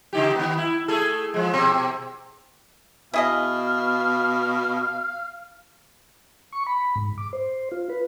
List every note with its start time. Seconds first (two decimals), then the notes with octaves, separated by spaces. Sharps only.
0.13 C#3 D#4 G4
0.36 D#3 B3
0.58 E4
0.88 A3 G#4 A4
1.34 F3 G#3
1.53 B2 C4
3.14 B2 E4 G#4 D#5 F5
6.53 C#6
6.67 B5
6.96 G#2
7.18 D6
7.33 C5
7.72 F4
7.89 B4